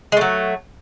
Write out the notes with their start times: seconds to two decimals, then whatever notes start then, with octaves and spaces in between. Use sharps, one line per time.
0.12 G#3
0.17 A3
0.21 F#3